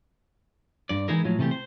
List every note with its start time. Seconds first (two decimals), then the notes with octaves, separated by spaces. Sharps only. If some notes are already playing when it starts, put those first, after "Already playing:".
0.89 G2 D5
1.08 E3 G#3 D#4 E4 G#4 A#4
1.25 A2 F3 F#3
1.39 C3 E3 A3 G4
1.51 C5